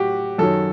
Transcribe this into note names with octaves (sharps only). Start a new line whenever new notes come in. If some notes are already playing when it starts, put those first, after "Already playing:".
Already playing: A2 F#3 F#4 G4
F#2 D#3 F#3 A4